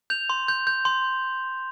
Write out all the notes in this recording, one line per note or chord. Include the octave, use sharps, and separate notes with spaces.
G6 F7
C6
G6
G6
C6